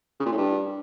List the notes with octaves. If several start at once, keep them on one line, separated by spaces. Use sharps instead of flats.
C#3
A#2
A2
G2